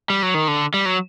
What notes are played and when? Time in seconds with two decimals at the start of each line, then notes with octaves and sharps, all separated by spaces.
0.10 G3
0.23 F#3
0.34 D#3
0.48 D3
0.74 G3
0.86 F#3